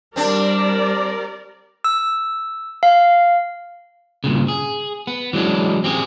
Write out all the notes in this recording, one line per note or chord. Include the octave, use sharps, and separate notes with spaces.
G3 C4 D4 A#4 D5
E6
F5
G2 A#2 C#3
G#4
B3
E3 F#3 G#3 C#4 D4
C4 G4 G#4